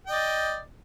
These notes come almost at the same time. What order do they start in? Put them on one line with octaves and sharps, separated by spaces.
G5 D#5 D5